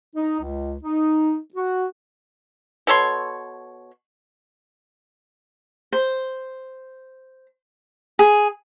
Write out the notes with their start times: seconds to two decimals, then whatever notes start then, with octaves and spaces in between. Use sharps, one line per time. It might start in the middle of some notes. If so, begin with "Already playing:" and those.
0.16 D#4
0.40 C#2
0.82 D#4
1.55 F#4
2.87 B2 A4 C#5 C6
5.92 C5
8.19 G#4